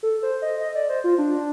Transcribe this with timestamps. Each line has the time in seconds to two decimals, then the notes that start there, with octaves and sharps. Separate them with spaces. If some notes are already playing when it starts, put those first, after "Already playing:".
0.03 A4
0.23 C5
0.42 D#5
0.61 D#5
0.75 D5
0.89 C5
1.04 F4
1.18 D4